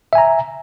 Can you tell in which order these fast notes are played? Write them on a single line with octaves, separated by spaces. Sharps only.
E5 G#5 A#5